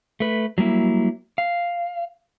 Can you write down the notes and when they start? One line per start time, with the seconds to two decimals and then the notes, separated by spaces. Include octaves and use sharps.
0.20 A3 B4
0.58 F#3 G3 A#3 E4
1.38 F5